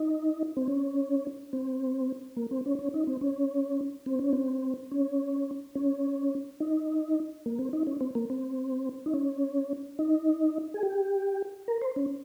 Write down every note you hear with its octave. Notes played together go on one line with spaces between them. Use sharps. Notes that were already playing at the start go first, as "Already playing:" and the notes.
Already playing: D#4
C4
C#4
C4
A#3
C4
C#4
C#4
D#4
C4
C#4
C4
C#4
C4
C#4
C#4
D#4
A#3
C4
D#4
C#4
C4
A#3
C4
D#4
C#4
D#4
G#4
G4
A#4
C5
C#4